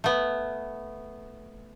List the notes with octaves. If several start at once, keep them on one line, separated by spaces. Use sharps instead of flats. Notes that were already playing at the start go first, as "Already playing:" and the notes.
A3 B3